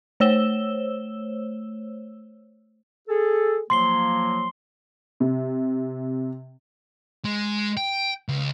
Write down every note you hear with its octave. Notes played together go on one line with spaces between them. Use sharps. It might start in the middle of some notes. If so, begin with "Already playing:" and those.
A3 C5 C#5 E6 E7 G7
G#4 A4
F3 F#3 A#3 C6 C7 G7
C3
G#3
G5
C#2